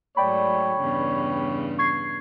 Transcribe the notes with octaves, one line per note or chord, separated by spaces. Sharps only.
G#2 F#3 A3 C#5 D5 G5 B5
E2 G2 C#3
C#6 G#6 C7